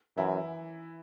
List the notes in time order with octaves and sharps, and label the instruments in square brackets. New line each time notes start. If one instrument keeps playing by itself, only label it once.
[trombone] F#2 [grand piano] E3 E4